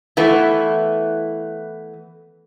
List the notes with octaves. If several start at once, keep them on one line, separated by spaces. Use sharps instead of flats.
E3 A3 B3